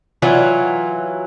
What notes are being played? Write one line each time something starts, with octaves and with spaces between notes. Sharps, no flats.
E3 F#3 F4